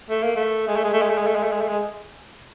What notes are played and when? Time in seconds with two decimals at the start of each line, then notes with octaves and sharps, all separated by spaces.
0.09 A3
0.23 A#3
0.36 A3
0.67 G#3
0.76 A3
0.84 G#3
0.93 A3
1.02 G#3
1.10 A3
1.18 G#3
1.27 A3
1.36 G#3
1.43 A3
1.52 G#3
1.61 A3
1.69 G#3